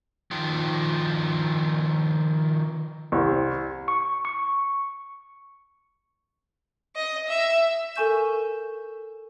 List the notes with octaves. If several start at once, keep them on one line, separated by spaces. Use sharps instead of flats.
D#3 F3
C2
C#6
C#6
D#5
E5
A4 A#4 G#5 C#6 G6 E7